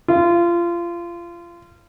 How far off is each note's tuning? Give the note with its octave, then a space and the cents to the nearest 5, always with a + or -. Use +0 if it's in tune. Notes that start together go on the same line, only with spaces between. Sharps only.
F4 -25